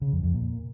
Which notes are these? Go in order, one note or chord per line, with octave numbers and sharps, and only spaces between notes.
C#3
F2
F2
A#2